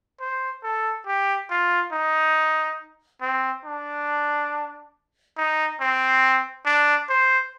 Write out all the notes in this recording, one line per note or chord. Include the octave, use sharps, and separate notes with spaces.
C5
A4
G4
F4
D#4
C4
D4
D#4
C4
D4
C5